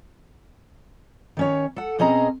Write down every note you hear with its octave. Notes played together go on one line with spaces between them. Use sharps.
D#3 C#4 C#5
A4 F#5
B2 C4 C#4 G#4 D#5 A#5